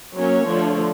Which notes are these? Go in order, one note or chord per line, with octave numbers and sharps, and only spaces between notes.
F#3 A#3 C#4 C#5
D3 F3 A3